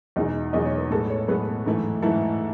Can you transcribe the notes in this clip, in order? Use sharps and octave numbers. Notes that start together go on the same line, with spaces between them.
E2 B2 G#3 D#4 D#5
E2 B2 G#3 D#4 D#5
C#5
B4
A2 G#3 B3 A4
C#5
A2 G#3 B3 B4
G#2 E3 A3 E4
G#2 E3 A3 E4 A4